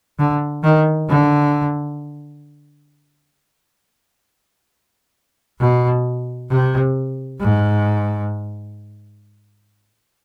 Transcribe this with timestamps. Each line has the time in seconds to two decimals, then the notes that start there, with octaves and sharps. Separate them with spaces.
0.19 D3
0.63 D#3
1.09 D3
5.60 B2
6.50 C3
7.40 G#2